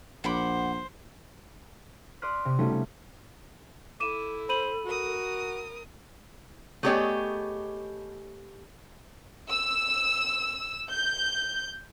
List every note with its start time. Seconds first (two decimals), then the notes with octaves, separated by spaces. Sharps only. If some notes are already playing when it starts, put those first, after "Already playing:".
0.24 A#1 C5 F#5 B5 D6
2.22 D5 C6 D#6 F6 F#6 B6
2.45 C3
2.59 G3 A3 C#4 D#4 F4 F#4
2.72 C3
4.00 E4 A4 D6 D#7 E7
4.49 C5 B5 D#7 F#7
4.85 F#4 A#4 D#6
6.83 A3 B3 G4 G#4 C#5 D#5
9.50 E6
10.91 G6